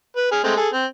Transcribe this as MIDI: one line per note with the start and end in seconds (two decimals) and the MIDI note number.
0.16 0.28 71
0.32 0.40 68
0.32 0.40 89
0.44 0.55 56
0.44 0.55 57
0.44 0.55 60
0.57 0.68 68
0.57 0.68 69
0.73 0.85 60